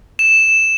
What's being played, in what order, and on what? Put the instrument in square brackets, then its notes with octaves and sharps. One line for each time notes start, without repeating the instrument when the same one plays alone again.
[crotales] E7